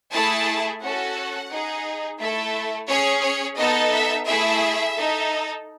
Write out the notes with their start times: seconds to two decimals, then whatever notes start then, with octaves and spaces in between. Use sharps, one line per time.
0.12 A3 E4 G#4 A5
0.81 C#4 F#4 A4 F#5
1.50 D#4 G#4
2.19 A3 E4 A4 E5
2.88 C#4 G#4 C#5
3.23 C#5
3.57 B3 D#4 A4 D#5
3.92 E5
4.26 A3 E4 G#4 E5
4.95 D#4 A4